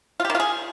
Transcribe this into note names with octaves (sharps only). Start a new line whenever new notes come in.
F4
G4
D#3
F4
G#4